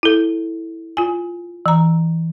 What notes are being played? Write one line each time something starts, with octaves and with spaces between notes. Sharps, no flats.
E4 A4
F4 G#5
E3 A#5